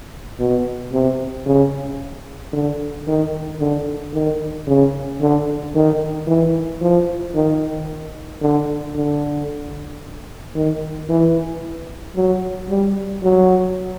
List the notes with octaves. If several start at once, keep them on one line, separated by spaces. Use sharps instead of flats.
B2
C3
C#3
D3
D#3
D3
D#3
C#3
D3
D#3
E3
F3
D#3
D3
D3
D#3
E3
F#3
G3
F#3